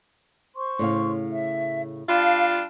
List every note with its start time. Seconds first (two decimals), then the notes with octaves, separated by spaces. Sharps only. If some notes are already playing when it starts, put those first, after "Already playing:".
0.55 C5 C6 C#6
0.79 A2 C#3 F5
1.32 E5
2.09 G3 D4 F4 F5 A5